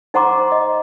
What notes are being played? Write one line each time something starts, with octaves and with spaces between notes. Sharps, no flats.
D#4 C5 F#5 A#5 C6 D6
D#5